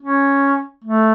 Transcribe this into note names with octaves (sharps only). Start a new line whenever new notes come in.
C#4
A3